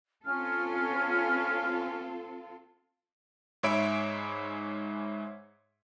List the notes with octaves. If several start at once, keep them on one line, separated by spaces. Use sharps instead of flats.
C4 C#4 F4 A4 F6
G#2 G#3 C#5 E5 B5 D7